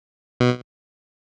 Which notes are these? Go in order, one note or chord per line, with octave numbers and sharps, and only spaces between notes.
B2